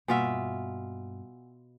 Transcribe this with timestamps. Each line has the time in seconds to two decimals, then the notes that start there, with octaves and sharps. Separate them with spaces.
0.08 G2 B2 A#3 F4 E5 F#5 G#5